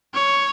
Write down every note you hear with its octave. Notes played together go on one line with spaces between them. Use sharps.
C#5